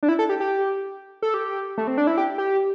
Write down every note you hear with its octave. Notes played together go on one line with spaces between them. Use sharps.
D4
E4
A4
G4
G4
A4
G4
A3
C4
D4
E4
G4
G4